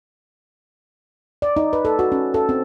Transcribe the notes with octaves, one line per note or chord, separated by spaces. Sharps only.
D5
D#4
B4
A4
F#4
C#4
A4
C4